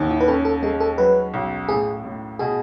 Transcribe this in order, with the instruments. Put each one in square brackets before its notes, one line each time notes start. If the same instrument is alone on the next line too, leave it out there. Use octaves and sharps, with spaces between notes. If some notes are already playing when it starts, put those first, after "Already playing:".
Already playing: [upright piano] A1 D#2 D#3
[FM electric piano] E4
B4
[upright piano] C#4 [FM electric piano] A4
[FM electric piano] A4
[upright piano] G#3 [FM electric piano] A4
[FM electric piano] A4
[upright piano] F#3 [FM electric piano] B4
[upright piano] B1
[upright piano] A2 [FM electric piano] G#4
[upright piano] A2
[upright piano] B2 [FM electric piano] G#4